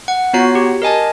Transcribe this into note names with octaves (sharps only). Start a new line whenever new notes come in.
F#5
B3 F4 F#4 C#5 A#5 C7
G4
A#4 D#5 G#5 A5